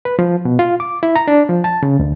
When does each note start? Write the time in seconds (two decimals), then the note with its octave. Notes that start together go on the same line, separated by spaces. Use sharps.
0.05 B4
0.19 F3
0.45 B2
0.59 F4
0.80 D6
1.03 E4
1.16 A#5
1.28 D4
1.49 F3
1.64 A5
1.83 C#3
1.99 D2